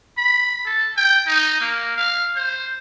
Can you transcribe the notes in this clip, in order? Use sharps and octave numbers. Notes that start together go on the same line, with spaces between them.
B5
A4
G5
D#4
A#3
F5
C5